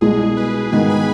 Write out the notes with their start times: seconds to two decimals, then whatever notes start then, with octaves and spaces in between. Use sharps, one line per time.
0.01 C2 B2 G#3 G#4
0.37 B4
0.72 G#2 D#3 B3 D#4 G#5
0.90 B5